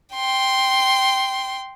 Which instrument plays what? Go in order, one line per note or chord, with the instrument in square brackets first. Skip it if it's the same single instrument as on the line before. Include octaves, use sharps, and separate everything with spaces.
[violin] G5 C6